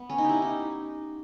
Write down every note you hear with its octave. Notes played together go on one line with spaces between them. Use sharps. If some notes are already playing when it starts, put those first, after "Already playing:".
Already playing: B3
C#4
D#4
E4 G4
D#4